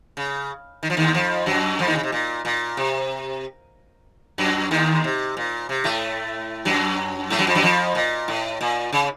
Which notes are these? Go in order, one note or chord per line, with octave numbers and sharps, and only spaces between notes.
C#3
D#3
F3
D#2 D#3
F2 F3
F#2 F#3
F2 F3
D#2 D#3
C#3
C3
A#2
A#2
C3
F#2 F#3
D#2 D#3
C3
A#2
C3
A2 A3
F#2 F#3
A2 A3
F#2 F#3
F2 F3
F#2 F#3
F2 F3
A#2
A2
A#2
C#3